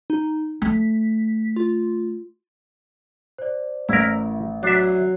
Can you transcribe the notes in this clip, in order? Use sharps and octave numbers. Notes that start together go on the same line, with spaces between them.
D#4
A3 B6
F4
C5 D5
A1 E4 A#4
F#3 D4 E5 F#6 C7